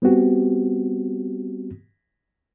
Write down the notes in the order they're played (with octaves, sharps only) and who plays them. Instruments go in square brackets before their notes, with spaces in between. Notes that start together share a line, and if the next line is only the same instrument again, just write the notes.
[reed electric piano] G3 B3 C4 F#4 G4